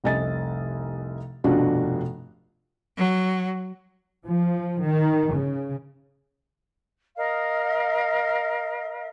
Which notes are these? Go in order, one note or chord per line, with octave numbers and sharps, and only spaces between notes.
F1 C2 D#5 G#5 A6
F1 G2 B2 D4 F4 F#4
F#3
F3
D#3
C#3
A#4 D#5 F5